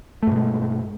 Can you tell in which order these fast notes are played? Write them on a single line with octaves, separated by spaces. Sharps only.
A3 G2 B2 G#3